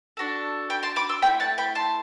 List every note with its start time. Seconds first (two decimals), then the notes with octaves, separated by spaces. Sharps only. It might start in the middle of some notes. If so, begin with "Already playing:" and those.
0.17 D4 F#4 A4
0.70 G5 B5
0.83 A5 C6
0.96 B5 D6
1.09 C6 E6
1.22 A3 C4 E4 G5 B5
1.40 F#5 A5
1.58 G5 B5
1.75 A5 C6